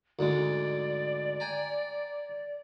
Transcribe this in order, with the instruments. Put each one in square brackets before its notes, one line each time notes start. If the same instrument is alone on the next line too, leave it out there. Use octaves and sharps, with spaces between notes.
[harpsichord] D2 G#2 G#3 [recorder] D5
[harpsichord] G5 G#5 A#5